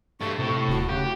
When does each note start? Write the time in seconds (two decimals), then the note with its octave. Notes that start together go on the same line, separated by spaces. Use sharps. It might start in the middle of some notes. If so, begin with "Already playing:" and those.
0.21 G2 A3 C#6
0.39 A2 C3
0.69 D#1 F#4
0.89 C#3 G4